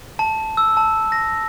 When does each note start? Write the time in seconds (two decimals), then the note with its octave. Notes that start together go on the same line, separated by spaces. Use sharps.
0.19 A5
0.57 E6
0.77 A5
1.12 A#6